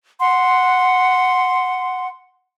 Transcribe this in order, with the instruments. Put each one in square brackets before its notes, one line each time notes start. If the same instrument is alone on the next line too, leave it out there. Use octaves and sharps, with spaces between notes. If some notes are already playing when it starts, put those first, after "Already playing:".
[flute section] F#5 C6